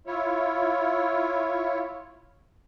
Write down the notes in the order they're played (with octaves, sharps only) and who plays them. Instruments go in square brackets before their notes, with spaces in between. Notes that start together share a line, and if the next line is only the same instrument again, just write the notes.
[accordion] E4 F4 C#5